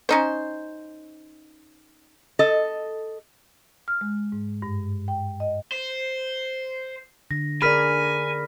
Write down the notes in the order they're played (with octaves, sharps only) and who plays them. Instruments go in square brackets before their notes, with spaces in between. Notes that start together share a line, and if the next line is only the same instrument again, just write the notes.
[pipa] C#4 D#4 C5
[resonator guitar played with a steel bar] A4 D#5
[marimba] F6
G#3
G#2
G2
G5
D#5
[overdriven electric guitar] C5
[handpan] D3 [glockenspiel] A#6
[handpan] G#4 A#4 D5 [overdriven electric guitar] G#5 [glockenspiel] B5 F6 B6